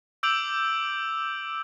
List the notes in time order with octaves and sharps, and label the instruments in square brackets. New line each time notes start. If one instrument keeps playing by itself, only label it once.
[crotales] D6 E6 G6 D7 F7 F#7